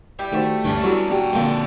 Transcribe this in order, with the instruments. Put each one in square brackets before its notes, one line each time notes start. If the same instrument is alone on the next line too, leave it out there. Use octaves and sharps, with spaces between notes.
[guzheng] G3 E4 G4
[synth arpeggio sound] D#3 F#4 C5 [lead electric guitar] A3
[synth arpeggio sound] D2 G2 [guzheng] E3 C#4 D4
[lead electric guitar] E2 E4 [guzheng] F#3 [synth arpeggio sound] G3 F#4 A4
[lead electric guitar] A#2 G5 [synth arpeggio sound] F#4 G4 D5
[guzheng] D3 F3 C4 [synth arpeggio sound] G#3 A#3